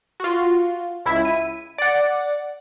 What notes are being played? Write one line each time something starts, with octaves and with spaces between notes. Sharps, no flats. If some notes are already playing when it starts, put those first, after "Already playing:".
F4 F#4
C#2 E4 E5
D#7
D5 F#5